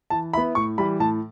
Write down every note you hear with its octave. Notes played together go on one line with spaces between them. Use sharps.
E3 A5
B3 E4 B5
A2 C#6
E3 G3 B5
A2 A5